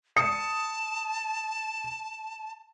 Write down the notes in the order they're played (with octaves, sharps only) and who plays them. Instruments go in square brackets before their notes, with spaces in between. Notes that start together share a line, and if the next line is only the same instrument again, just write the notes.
[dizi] A5 [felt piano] D#6 C#7